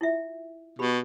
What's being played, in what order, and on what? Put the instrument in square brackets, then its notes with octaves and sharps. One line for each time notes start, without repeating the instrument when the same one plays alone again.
[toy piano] E4 F4 E5
[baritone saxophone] B2 [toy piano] G4 B5